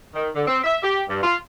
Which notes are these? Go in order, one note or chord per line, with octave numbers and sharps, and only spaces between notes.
D#3
D3
C4
E5
G4
G2
F4